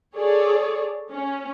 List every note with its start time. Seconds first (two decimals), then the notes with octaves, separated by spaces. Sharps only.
0.15 G#4 A4 C#5 D5
1.11 C#4